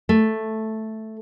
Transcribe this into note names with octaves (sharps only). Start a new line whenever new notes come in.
A3